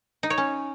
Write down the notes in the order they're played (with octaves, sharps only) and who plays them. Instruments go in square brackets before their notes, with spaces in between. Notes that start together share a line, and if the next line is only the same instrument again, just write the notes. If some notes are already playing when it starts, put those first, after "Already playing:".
[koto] D#4
C#5
C#4